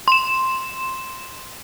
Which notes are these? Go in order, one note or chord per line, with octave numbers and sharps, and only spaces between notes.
C6 E7